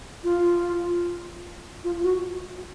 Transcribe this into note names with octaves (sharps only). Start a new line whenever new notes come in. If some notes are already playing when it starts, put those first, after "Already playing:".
F4
F4
F#4